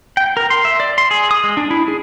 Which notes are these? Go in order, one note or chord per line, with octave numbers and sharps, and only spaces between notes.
G5
A#4
C6
E5
D5
C6
G#4
D#6
G#3
D4
E4
G#4